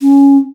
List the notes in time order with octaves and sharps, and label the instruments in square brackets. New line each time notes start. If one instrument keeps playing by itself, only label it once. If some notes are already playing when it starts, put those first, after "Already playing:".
[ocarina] C#4